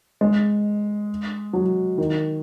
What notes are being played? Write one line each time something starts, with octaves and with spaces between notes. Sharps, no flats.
G#3
F#3
D#3